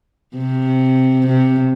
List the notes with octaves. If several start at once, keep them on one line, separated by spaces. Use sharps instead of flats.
C3
C3